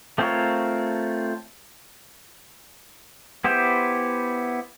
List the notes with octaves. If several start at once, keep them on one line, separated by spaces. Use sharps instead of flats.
A3 C4 F4 A#4 C#5
B3 E4 G4 C5